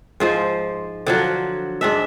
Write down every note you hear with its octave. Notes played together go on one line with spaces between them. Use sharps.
G#2 F3 C5
D3 F3 F#3
G#2 D4 E5